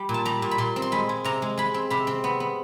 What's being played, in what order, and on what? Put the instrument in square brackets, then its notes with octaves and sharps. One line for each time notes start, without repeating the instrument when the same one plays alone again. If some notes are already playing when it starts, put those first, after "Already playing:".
Already playing: [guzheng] G3
A#2
A5
G3 A#5
A#2
B5
A#2 C6
C4
C6
G#3 B5
G#3
C3 A#5
G#3
G#3 B5
C4
C3 B5
C4
B3
B3